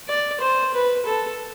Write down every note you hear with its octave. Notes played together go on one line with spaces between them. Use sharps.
D5
C5
B4
A4